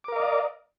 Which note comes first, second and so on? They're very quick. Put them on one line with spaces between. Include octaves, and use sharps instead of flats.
D6 A#4 F5 D#5 D5